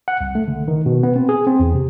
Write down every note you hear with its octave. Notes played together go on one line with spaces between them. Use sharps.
F#5
C2
A3
D3
D#3
B2
B3
C4
G#4
C4
E2
C3